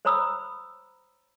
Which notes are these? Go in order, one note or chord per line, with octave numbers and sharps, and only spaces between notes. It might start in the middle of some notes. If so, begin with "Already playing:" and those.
C5 C#5 A#5 B5 D#6 E6